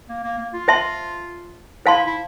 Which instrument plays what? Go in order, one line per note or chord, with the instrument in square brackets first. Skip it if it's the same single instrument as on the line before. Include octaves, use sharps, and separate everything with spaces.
[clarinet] A#3
A#3
A#3
F4
[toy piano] C5 E5 A5 C6
[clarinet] E4 [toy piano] C5 F5 A5 C6
[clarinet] E4